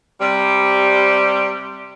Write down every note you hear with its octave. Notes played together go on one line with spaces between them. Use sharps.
C3 G3